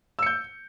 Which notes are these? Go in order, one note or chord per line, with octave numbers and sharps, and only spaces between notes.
E6 G6 C#7